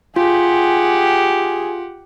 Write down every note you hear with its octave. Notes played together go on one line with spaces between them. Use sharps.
F4 G4 G#4 F#5